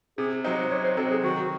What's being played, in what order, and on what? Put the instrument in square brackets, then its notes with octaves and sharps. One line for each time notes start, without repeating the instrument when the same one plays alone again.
[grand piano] C3 [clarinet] G#4
[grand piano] F#3 C4 D#4 [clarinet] C5
[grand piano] C3 [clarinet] C#5
[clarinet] C5
[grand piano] F#3 C4 D#4 [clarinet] A4
[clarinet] G#4
[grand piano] D#3 [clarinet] F#4